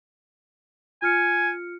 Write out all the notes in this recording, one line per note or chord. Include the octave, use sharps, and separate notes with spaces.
F4 G#5 F6 C#7